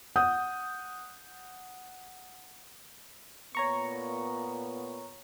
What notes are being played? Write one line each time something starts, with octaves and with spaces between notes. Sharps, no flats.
F#5 D#6 G6
A#2 B3 C#5 A#5 C#6